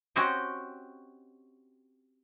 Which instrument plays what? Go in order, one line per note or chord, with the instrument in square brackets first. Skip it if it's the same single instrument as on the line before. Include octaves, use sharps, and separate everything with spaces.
[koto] C4 C#4 F#4 G4 D#5